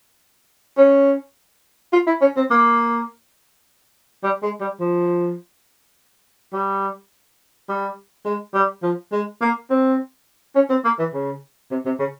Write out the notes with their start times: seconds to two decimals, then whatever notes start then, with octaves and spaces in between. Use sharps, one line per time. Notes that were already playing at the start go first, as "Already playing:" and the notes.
0.77 C#4
1.93 F4
2.07 E4
2.21 C#4
2.36 C4
2.50 A#3
4.23 G3
4.43 G#3
4.61 G3
4.80 F3
6.53 G3
7.69 G3
8.25 G#3
8.54 G3
8.83 F3
9.12 G#3
9.41 A#3
9.70 C4
10.55 C#4
10.70 C4
10.84 A#3
10.99 E3
11.13 C#3
11.71 C3
11.86 C3
11.99 C#3